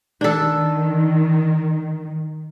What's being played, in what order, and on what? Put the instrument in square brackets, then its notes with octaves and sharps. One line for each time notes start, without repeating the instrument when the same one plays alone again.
[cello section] D#3 [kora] D4 A4